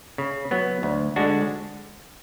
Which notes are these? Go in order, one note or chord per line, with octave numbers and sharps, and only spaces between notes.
C#3
F#3 B3
D2
D3 G#3 D4 F#4